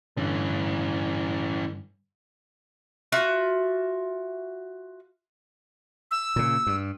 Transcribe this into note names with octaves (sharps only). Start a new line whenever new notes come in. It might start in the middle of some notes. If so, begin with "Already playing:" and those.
G2 D3 E3 C#4
F4 F#4 E5
E6
A#2 C#3
G2